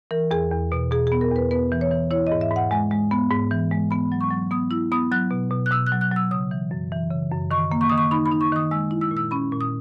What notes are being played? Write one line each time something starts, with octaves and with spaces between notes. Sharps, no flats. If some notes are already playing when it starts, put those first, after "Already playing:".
E3 A#4
E2 G#4
E2
B2
B2 G#4
B3 G#4
A#4
E2 B4
B3 B4
E3
C#5
E3
E4 C#5
D#5
G#2
E5
G#2
F#5
G#3 G#5
G#3
B3
G#2
E3
G#3
B3 B5
F#3
C#6
F#3
B3 D#6
E4 E6
B3 D#6
F#3 F#6
B2
B2
F#6
B2 E6
F#6
F#3
F#6
F#3
E6
C#3 D#6
E3
F#2
E3
C#3
F#2
D#3 C#6
A#3
C#6
D#3 D#6
C#6
D#4 B5
B5
D#4
C#6
D#3 D#6
G#3 E6
E4
E6
A#2
E6
C#4 B5
A#2
D#6